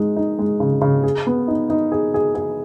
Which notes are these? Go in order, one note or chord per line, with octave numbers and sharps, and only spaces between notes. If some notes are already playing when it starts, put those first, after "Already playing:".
Already playing: G#3 D#4
D#4
G#3
C#3
C#3
G#4
B3
D#4
D#4
G#4
G#4
G#4